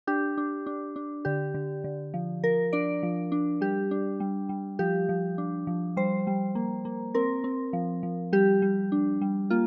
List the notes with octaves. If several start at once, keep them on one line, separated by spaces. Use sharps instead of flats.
D4 G4
D4
D4
D4
D3 G4
D3
D3
F3
F3 A#4
D4 D5
F3
D4
G3 G4
D4
G3
G3
F3 G4
F3
D4
F3
G3 C5
G3
A#3
A#3
C4 A#4
C4
F3
F3
G3 G4
G3
D4
G3
A#3 F4